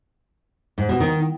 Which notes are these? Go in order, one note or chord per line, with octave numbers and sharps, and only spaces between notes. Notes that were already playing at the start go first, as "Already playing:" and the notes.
G#2
B2
D#3